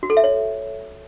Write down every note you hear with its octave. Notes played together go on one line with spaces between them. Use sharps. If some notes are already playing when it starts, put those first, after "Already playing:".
F#4
A4
E5
C#5